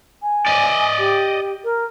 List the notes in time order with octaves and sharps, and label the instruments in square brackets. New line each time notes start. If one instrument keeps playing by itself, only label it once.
[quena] G#5
[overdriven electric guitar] D5 D#5
[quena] G4
A#4